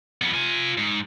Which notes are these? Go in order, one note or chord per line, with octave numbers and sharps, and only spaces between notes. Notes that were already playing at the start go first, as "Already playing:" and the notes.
F2 B3
F4 G#5
G#2